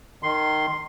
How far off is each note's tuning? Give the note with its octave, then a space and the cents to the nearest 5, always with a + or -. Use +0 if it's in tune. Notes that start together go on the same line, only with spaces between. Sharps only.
D#3 -15 C6 +0